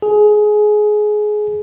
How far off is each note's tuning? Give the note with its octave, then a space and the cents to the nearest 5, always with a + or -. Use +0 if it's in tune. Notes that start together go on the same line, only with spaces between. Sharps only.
G#4 +20